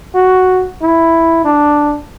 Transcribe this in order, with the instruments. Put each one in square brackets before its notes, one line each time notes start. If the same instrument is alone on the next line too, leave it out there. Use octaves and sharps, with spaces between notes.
[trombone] F#4
E4
D4